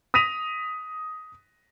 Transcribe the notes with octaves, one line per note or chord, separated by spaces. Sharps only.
D#6 A#6 B6 D#7 F7